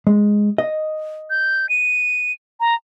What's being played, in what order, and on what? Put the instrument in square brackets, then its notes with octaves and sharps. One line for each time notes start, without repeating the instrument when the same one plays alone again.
[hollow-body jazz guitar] G#3
D#5
[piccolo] G6
D#7
A#5